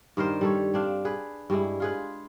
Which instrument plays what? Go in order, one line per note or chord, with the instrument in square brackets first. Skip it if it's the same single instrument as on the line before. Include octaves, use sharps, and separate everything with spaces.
[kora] G2 D#3 A#4 C5
G3 A4 C#5
C4 D4 F5
G#4 B4
G2 G3 G#3 E4
F4 G#4 B4